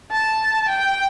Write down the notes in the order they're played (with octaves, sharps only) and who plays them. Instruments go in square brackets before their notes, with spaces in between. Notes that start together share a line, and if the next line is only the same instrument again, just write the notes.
[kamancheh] A5
G5